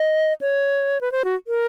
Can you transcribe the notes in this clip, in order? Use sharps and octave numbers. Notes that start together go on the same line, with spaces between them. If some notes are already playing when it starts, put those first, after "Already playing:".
Already playing: D#5
C#5
B4
C5
F#4
A#4